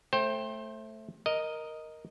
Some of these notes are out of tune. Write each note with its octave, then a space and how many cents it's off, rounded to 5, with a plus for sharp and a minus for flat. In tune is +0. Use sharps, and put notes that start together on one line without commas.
A3 +0 C5 +30 G5 +0
A#4 +0 D#5 +0